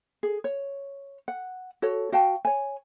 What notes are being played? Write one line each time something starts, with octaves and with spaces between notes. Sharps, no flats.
G#4
C#5
F#5
F#4 A4 C#5
F#4 F5 G5 A5
C#5 G#5